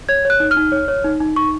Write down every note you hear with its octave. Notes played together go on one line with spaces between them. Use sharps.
C#5 G#6
C#5
F#6
D#4
F6
D#4
C#5
C#5
D#4
D#4
D#4 C#6